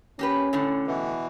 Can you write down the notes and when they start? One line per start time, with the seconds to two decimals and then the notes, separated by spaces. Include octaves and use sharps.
0.19 A#3 C#4 G4 B4
0.53 A2 D3
0.87 B2 E3